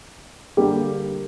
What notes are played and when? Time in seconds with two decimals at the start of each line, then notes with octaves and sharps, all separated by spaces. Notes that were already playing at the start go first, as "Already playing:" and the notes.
0.57 D3 G3 A#3 G4